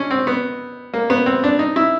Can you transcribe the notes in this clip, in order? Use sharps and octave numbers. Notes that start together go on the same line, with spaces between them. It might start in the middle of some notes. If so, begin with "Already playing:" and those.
Already playing: C#4 D4
C4
B3
A#3
B3
C4
D4
D#4
E4